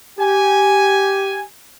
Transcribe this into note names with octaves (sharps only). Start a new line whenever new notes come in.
G4 G#5